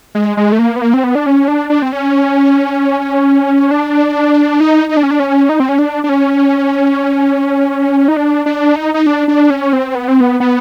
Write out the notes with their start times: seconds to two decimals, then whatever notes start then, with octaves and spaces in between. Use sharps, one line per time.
0.15 G#3
0.37 G#3
0.52 A3
0.59 A#3
0.76 B3
0.82 A#3
0.94 C4
1.04 B3
1.15 D4
1.26 C#4
1.48 D4
1.70 D4
1.82 C4
1.93 C#4
3.71 D4
4.60 D#4
4.89 D#4
4.97 D4
5.03 C#4
5.11 D4
5.20 C#4
5.49 D#4
5.60 C4
5.69 C#4
5.79 D4
6.04 D4
6.09 C#4
8.08 D#4
8.17 D4
8.46 D4
8.76 D#4
8.94 D#4
9.06 D4
9.28 D4
9.50 C#4
9.73 C4
9.95 B3
10.08 C4
10.20 B3
10.40 B3